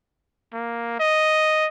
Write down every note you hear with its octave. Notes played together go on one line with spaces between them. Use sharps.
A#3
D#5